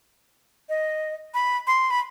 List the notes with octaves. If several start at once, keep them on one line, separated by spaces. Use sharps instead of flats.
D#5
B5
C6
B5